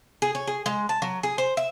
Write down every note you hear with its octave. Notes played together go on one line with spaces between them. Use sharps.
G#4
C#5
G#4
G#3
A5
F#3
G#4
C5
E5